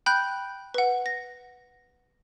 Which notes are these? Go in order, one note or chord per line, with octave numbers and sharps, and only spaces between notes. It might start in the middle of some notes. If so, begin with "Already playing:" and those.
G5 B5 F#6 G6
B4 F#5
A#6